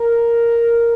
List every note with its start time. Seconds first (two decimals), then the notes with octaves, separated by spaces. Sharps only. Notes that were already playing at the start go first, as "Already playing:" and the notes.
Already playing: A#4